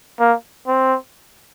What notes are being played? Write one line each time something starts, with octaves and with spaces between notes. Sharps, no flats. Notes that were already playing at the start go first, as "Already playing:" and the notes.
A#3
C4